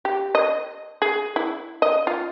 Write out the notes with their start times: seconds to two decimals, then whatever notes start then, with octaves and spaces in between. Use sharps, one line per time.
0.05 G4
0.35 D#5
1.02 G#4
1.36 E4
1.82 D#5
2.07 F4